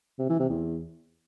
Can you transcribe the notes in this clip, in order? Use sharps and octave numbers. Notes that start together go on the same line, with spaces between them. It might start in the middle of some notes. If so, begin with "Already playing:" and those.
C3
E3
C3
E2